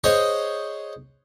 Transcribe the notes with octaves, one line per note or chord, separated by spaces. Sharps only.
G#4 C5 C#5 D#5 F#5